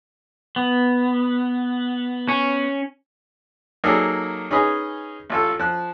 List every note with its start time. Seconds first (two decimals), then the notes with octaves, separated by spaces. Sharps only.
0.56 B3
2.28 C#4
3.84 F#3 A#3 D#4 G#4 A4 D5
4.51 C#4 D#4 G#4 B4 D#5
5.30 A1 F4 A4
5.59 F3 F#6